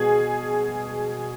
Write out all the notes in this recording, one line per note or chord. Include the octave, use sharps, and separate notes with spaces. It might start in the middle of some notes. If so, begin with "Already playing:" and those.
Already playing: B2 G#4